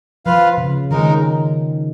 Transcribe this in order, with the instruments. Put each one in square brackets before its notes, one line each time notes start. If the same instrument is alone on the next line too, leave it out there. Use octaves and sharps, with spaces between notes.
[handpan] F3 [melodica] F4 B4 F5
[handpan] C#3
[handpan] D#3 [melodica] G#3 D#4 A#4